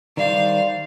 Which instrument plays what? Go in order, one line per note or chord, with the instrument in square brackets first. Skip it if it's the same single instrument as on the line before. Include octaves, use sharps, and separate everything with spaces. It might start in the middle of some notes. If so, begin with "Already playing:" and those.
[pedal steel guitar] D#3 G3 C5 [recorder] D5 [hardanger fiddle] F5